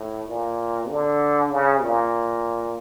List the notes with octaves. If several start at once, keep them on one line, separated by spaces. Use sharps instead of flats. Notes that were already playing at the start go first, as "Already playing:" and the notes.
Already playing: A2
A#2
D3
C#3
A#2